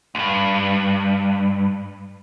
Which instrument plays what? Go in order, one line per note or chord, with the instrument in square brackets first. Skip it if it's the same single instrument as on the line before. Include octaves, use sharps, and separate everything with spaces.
[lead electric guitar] D2 G2